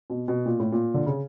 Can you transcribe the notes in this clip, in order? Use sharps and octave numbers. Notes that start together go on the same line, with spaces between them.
B2
B2
A#2
A2
A#2
D3
C#3